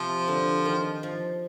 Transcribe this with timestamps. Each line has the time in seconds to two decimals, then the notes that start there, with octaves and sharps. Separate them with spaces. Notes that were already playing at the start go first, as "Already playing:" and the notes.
Already playing: C3 F3
0.28 D3
0.65 D#3
1.03 F3